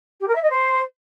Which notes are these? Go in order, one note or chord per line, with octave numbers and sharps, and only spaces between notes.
G4
A#4
E5
D#5
C5